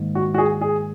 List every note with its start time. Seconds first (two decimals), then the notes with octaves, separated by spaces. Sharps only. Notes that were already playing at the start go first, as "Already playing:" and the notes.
Already playing: G#2 D#3 A#3
0.15 F#4
0.34 F#4
0.38 G#4
0.61 G#4